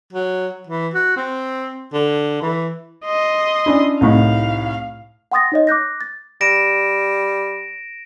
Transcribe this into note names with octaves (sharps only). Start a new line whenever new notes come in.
F#3
E3
F#4
C4
D3
E3
D#5 C6
C#4 D4 E4
C2 A2 D#4 F5
F#5 G5 C6 D#6 A6 A#6
D#4 C#5 D#5
D6 F#6 G6 A#6
A6
G3 A#6 D7 E7